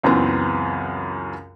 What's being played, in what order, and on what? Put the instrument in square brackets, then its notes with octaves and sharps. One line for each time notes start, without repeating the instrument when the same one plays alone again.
[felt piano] C#2 F#2 E3 B3 C4